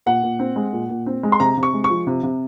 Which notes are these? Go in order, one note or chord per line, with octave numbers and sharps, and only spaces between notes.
A#2 F#5
A#2
C4
G#3
A#2
A#2
C4
G#3
C6
C3 A#5
C3
C#6
G#3
C#6
F3
C3
C3